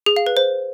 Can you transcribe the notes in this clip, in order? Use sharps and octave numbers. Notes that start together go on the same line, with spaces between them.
G#4
F5
B4
C5